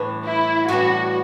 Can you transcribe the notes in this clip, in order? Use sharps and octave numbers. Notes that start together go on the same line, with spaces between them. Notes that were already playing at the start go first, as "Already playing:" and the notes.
Already playing: A2 E3 G3 D4
E4
A2 E3 G3 D4 F#4